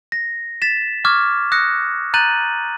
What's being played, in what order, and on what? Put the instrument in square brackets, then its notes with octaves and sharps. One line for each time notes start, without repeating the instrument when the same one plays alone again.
[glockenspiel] A#6
A6 B6 E7
C#6 D6 F6 G#6
D#6 F#6 A#6 C#7
A#5 F#6 G6 A6 D#7 F#7